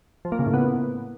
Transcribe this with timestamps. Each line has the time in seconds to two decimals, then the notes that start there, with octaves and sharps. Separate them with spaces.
0.25 F3
0.32 A#3
0.39 C#3
0.46 A2
0.54 B3